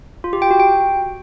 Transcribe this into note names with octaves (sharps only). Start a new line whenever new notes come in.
F4
G4
G5
F#4
G5